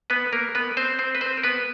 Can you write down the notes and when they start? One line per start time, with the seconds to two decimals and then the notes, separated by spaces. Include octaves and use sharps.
0.10 B3 B4
0.33 A#3 A#4
0.55 B3 B4
0.77 C4 C5
0.99 C4 C5
1.15 B4
1.21 C4 C5
1.37 A#4
1.43 B3 B4